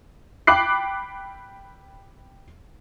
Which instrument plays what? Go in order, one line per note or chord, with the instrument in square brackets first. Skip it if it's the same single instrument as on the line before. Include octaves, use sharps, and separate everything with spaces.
[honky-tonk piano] G5 B5 D6 F#6 C7